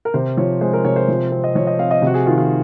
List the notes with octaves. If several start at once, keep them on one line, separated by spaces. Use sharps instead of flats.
A#4
C3 C5
F3 C#5
G#3 C5
A#4
C3 C#5
C5
F3
C4
D#5
F3 C#5
D#5
C4 F5
D#5
C3 F#4
G#4
D#3 F4
F4